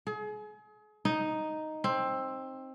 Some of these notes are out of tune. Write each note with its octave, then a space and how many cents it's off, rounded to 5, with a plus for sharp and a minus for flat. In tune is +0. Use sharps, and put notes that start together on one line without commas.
G#4 +35
D#4 +0
C4 +15